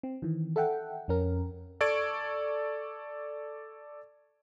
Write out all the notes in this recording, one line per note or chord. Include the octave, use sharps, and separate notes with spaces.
C4
D#3 E3
A4 E5 F#5 G5
F2 C#4 A#4
A4 D5 C#6 G#6 D7